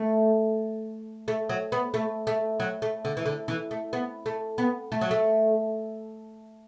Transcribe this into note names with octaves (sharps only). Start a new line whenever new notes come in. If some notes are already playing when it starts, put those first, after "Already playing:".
Already playing: A3
A3
F#3
B3
A3
A3
F#3
A3
D3
E3
D3
E3
A3
B3
A3
B3
A3
F#3
A3